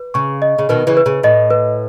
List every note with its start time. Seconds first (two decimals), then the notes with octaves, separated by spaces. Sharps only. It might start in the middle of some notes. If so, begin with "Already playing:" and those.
Already playing: B4
0.14 C#3 C#6
0.42 D#5
0.58 C#3
0.69 B2 D#3 B4
0.87 C#3 E3
0.97 B4
1.06 C#3
1.23 A2 D#5
1.50 B4